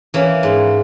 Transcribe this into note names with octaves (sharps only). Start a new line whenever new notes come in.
E3 A#3 C#4
G#2